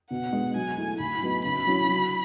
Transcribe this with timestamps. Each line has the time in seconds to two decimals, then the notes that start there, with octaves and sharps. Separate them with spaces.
0.11 B2 F#5
0.33 G#3 B3
0.56 F#3 G#5
0.77 A3 E4
0.99 A2 B5
1.22 F#3 B3 D#4
1.44 C#3 B5
1.67 F#3 C#4 E4
1.89 F#3